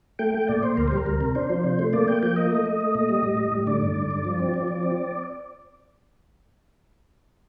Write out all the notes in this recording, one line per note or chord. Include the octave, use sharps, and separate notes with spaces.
A3 G5
A3 G5
A#2 D5
A#2 C5
D2 A#4
G3 C5
A#4
D2
C3
D4 C5
F3
C3
A3
A#3 D5
A#3 G5
F3 G5
A#3 D#5
A3
A3
A3
A#2
G3
A2
G3
A2
D3 D5
G2
D3
G2
F3
C4
F3
F3
C4